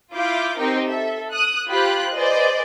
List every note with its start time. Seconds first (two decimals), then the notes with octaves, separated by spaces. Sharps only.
0.13 E4 F4 F5 D6 G6
0.57 C4 D#4 G4 A#4 G5
0.87 A4 E5
1.30 D#6 F#6
1.68 F4 G4 C5 B5 F#6
2.13 G#4 B4 C5 D5 D#5